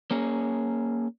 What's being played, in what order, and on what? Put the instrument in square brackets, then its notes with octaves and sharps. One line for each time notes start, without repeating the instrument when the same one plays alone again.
[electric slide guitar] A#3 C#4 G#4